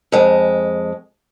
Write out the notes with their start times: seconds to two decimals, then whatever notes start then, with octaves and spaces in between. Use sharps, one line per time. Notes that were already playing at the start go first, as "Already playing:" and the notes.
0.12 F2 G#3